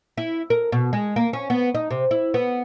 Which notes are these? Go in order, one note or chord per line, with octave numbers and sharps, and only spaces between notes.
E4
A#4
B2
G#3
A#3
C#4
B3
D#4
C3
E4
B3